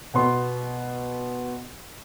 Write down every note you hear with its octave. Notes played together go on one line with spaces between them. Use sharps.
B2 B3 C6